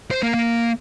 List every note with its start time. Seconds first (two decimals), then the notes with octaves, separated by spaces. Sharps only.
0.11 C5
0.23 A#3
0.34 A#3